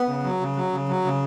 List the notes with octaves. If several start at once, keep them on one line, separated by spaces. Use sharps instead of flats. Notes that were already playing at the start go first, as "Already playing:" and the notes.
Already playing: B3
C#3
F#3
C#3
F#3
C#3
F#3
C#3